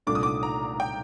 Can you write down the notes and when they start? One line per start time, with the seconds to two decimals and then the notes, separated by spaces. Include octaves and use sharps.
0.07 C2 A#2 A3 D4 D6
0.15 D#6
0.23 D6
0.43 A#5
0.80 G5